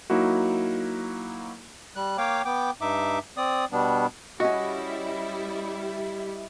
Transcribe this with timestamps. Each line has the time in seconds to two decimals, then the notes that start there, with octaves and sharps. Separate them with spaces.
0.10 F#3 A#3 D#4 E4 F#4
1.96 G3 F#6
2.18 A#3 C#5 F5 G5 D6
2.45 B3 G5 D6
2.81 G2 D#4 E5 D6
3.37 C4 D5 D#6
3.72 B2 G3 B3 D4
4.40 G3 C#4 E4 F#4 D#5